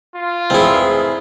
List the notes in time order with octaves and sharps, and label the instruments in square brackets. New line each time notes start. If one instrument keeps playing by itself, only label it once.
[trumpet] F4
[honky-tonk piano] F1 E3 G#4 [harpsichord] C4 E4